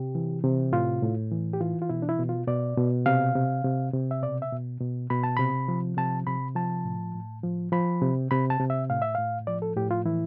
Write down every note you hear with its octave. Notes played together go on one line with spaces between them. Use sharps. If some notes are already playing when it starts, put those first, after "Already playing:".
Already playing: C3 G4
E3
C3
A2 F4
A2
E3
G4
E3 F4
F4
B2 E4
D4
E4
B2
F4
B2 D5
B2
C3 F5
C3
C3
C3
E5
B2 D5
E5
B2
B2
B2 B5
A5
C3 B5
F3
C3 A5
C3 B5
F3 A5
A2
A2
F3
F3 B5
C3
C3 B5
A5
C3
E5
A2 F5
E5
A2 F5
F3 D5
A4
A2 G4
F4
E3 E4